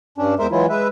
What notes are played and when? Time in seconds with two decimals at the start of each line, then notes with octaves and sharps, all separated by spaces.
0.18 G2 C#4 D4
0.39 E2 G#3 A#4 C5 E5
0.51 E3 F#3 G#3 E4 F4
0.69 G#3 B4 E5